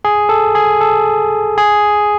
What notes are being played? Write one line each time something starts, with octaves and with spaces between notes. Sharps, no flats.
G#4
A4
G#4
A4
G#4